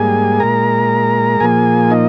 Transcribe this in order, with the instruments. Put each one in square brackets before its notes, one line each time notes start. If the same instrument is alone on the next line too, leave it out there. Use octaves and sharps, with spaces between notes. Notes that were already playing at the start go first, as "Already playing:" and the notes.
Already playing: [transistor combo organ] G#2 G3 A#3 G#4 G#5
A#2 G#3 A#4 A#5
A#2 F3 A#3 G#4 G#5
D#4 D#5